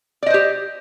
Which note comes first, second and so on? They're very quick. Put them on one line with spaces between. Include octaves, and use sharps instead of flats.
D5 D#5 C5 G4